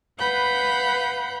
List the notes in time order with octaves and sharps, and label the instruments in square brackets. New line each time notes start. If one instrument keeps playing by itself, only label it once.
[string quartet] B4 F5 F#5 B5 G6